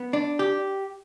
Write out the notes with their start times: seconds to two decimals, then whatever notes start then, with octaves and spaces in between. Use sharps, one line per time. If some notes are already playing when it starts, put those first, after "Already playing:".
Already playing: B3
0.13 D4
0.39 G4